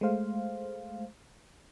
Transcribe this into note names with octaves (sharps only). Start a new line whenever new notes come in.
G#3 A3 C5 F5